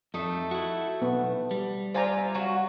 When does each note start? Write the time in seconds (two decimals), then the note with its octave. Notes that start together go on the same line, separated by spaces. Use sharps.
0.14 F2 A3 D#4 E5
0.51 E4 F#4
1.02 B1 B3
1.51 G3
1.94 F4 C5 D5 E5 G#5 A#5
2.35 F#3 F#4